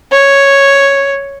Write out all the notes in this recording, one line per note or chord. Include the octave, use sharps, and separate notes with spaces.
C#5